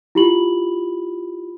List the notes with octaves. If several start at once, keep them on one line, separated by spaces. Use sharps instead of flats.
E4 F4 G4 B5 F#7